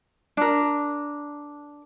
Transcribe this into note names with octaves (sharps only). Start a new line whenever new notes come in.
D4 A#4